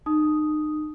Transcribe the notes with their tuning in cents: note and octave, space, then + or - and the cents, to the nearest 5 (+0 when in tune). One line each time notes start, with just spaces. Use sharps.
D#4 -35 D#6 +0